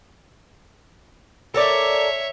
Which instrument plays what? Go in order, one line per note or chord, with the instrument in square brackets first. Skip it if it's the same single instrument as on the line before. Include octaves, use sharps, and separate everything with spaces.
[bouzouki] A4 A#4 D5 [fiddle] C#5 E5